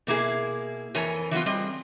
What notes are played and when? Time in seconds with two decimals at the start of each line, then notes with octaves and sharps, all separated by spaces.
0.07 B2 A#3 E4 G#4
0.94 F2 E3 A#4 C#5 G#5
1.31 E3 F#3 B3 F4
1.46 G3 C4 G#4 D#5